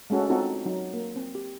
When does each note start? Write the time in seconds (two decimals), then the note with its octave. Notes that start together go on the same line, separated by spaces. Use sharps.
0.10 G#3 A3 C#4 F#4 A4
0.29 C4 D#4 F4 F#4 A4
0.65 F#3 D#4
0.93 A#3
1.16 C4
1.35 G4